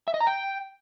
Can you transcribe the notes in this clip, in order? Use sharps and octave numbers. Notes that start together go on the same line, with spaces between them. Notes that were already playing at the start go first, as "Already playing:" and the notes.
E5
D#5
A#5
G5